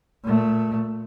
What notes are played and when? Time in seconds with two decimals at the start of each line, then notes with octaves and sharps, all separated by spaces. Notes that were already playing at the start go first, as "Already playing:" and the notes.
0.24 A#2 A3